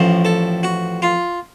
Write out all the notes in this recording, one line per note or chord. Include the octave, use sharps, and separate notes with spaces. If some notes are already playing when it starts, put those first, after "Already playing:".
Already playing: A1 A2 F3
A4
F#4
F4